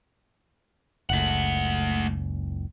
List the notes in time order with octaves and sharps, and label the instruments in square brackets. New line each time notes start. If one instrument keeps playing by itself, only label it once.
[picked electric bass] F#1 C#2 [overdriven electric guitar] A3 F#5